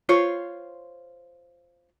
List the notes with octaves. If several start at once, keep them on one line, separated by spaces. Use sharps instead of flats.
F4 C5 C#5